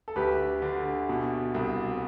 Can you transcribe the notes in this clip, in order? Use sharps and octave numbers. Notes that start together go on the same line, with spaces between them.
A4
D2 G4 B4
D3
B2
C2